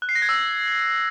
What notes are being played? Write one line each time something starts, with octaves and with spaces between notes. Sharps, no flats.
F#6
C7
A#6
G#6
E6